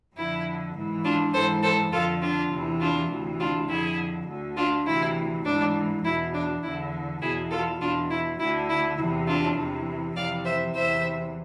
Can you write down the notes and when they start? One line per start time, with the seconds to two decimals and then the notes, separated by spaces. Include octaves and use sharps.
0.15 F2 D3 E4
0.74 G#2 E3
1.04 D4 F4
1.33 G#2 E3 A4 C5
1.62 A4 C5
1.92 F2 D3 F4 A4
2.22 D4 F4
2.51 E2 C3 E3
2.80 D4 F4
3.10 D2 C3 E3
3.39 D4 F4
3.69 F2 D3 E4 G#4
4.27 D2 D3
4.56 D4 F4
4.86 D2 C3 E3 E4
5.45 G#2 E3 D4
6.04 E2 B2 E4
6.33 D4
6.62 E2 D3 E4
7.21 E2 B2 E4 G#4
7.50 F4 A4
7.80 E2 B2 D4 F4
8.10 E4
8.39 D2 D3 E4
8.69 E4
8.98 E2 C3 E3 E4
9.27 D4 F4
9.57 E2 C3 E3
10.16 F2 C3 E3 D5 F5
10.45 C5 E5
10.74 E2 C3 E3 C5 E5